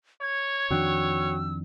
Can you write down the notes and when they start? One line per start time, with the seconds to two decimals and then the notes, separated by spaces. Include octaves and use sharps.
0.22 C#5 G#6
0.71 F2 D#3 D4 F#4 G5 E6 F#6